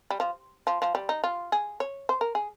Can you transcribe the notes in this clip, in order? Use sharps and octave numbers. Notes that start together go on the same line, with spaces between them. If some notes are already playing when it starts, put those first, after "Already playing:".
G3
F3
F3
F3
G3
D#4
F4
G#4
C#5
C5
A#4
G#4